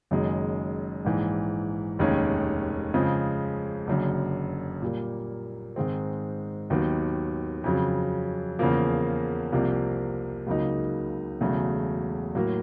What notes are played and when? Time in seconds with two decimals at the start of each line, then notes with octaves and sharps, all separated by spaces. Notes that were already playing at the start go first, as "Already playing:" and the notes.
0.11 F#1 F#2 D#3 G#3
1.05 A#1 G#2 E3
1.99 F1 D#2 D#3 G#3 C#4
2.94 F2 C#3 F3 G#3
3.87 F#1 F#2 D3
4.82 A#2 G3 A#3
5.76 G#2 D#3 G#3 C4
6.70 D#2 D#3 F#3 B3
7.64 F2 C#3 F#3
8.59 E2 C#3 F3 A#3
9.52 C2 C3 F3 A#3
10.47 C#2 C#3 F#3 A#3 D#4
11.41 E1 E2 C#3 F#3 A3
12.35 A2 F#3 A#3